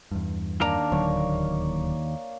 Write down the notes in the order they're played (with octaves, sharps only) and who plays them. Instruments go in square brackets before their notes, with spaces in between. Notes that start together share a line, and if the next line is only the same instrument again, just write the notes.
[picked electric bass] E2 G2
[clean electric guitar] D#2 A#4 A#5 [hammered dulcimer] A#3 D4
[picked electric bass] D1 D3 F#3 [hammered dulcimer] C#5